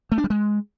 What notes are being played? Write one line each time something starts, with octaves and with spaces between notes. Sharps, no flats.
A3
D4
G3
G#3